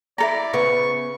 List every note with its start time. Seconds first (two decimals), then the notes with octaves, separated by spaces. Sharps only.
0.18 E4 A4 D5 A#5
0.53 C#3 B3 C#6